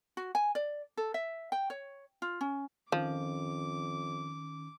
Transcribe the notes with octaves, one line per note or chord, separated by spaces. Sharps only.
F#4
G#5
D5
A4
E5
G5
C#5
F4
C#4
F2 D#3 F3 C#4 D6